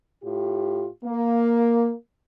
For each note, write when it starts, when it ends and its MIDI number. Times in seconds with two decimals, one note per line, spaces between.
0.23 0.88 45
0.23 0.88 65
0.23 0.88 67
1.05 1.92 58